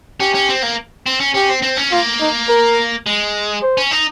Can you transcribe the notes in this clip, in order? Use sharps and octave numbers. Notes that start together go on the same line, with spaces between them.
C#4 G4
C#4
C4
A#3
C4
C#4
C#4 G4
C4
C4
C#4
A#3 F4
D#4
A#4
G#3
C5
C#4
D#4